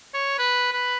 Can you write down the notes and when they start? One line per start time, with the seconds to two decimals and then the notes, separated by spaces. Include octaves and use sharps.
0.14 C#5
0.39 B4
0.73 B4